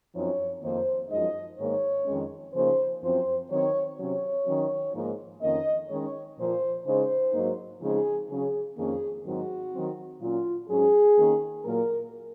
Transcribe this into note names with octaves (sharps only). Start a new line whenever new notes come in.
F#2 F3 C4 D#4 C#5
F2 D#3 A#3 D#4 C5
F#2 F3 G#3 D#4 D#5
G#2 D#3 A#3 D#4 C#5
F2 D#3 G#3 C#4
C#3 F3 A#3 D#4 C5
F#2 F3 C4 C5
D#3 F#3 C4 C#5
C3 F#3 C#4 C#5
D#3 F#3 C#4
G#2 F3 A#3 D#4
F2 D#3 A#3 C#4 D#5
D#3 G#3 C#4 C#5
A#2 F3 A#3 C5
C#3 G#3 D#4 C5
G#2 F#3 A#3 D#4
C#3 F3 G#3 C4 D#4 G#4
C#3 F#3 C#4 G#4
F2 D#3 A#3 C#4 G#4
G#2 D#3 F#3 C4 D#4 F#4
D#3 F#3 C4
A#2 F#3 C#4 F4
G#2 F#3 C#4 G#4
D#3 A#3 C#4
A#2 F#3 A#3 A#4